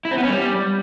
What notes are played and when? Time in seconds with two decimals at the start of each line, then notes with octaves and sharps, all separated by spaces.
0.05 E4
0.11 C4
0.17 B3
0.24 C#4
0.30 G3